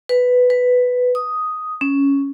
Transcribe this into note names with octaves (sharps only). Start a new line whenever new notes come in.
B4
B4
D#6
C#4